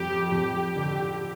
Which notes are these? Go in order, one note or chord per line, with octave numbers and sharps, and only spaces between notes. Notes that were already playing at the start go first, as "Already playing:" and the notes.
Already playing: F2 G3 G4
F2 G4
D3